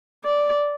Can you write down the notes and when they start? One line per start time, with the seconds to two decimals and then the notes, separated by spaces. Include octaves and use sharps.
0.25 D5